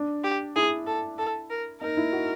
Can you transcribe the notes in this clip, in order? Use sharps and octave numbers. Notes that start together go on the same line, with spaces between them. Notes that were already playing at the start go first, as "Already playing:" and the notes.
Already playing: D4
G4
E4 G#4
A4
A4
A#4
D#4 A#4
E4
F#4